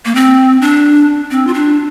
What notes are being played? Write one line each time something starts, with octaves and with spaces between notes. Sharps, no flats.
A#3
C4
D4
C4
F4
D4